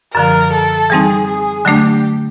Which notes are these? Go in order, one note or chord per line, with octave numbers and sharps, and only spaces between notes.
F#2 D3 F3 A#4
A4
E3 G3 C4 D#4 G#4
G#4
D3 F#3 A3 D4 G4